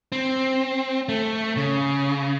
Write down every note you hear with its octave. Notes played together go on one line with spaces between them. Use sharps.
C4
A3
C#3